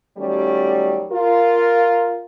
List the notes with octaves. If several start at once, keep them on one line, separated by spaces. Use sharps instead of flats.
D#3 F#3 G3 A3 C#4 D5
F4 A#4